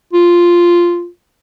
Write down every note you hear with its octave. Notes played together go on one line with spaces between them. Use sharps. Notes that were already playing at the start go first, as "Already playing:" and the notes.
F4